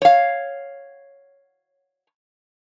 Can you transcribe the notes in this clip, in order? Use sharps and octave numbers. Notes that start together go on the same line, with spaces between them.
C#5 F5